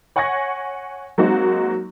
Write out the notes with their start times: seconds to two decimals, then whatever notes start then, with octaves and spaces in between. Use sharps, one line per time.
0.16 C#5 F#5 G#5 C#6 G#6 A#6
1.18 F#3 G#3 A#3 C4 D#4 F#4